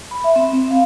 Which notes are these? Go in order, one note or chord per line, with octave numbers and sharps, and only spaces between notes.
B5
E5
C4
C4
F5